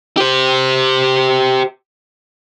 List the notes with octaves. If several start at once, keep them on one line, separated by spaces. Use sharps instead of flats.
G4 C5